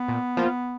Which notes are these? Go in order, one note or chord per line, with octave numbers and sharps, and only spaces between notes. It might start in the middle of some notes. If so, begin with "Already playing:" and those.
Already playing: B3
A#2
F3 A#3 F4